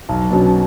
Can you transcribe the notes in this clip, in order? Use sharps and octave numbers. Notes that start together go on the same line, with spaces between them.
B1
B2 F#3 C#4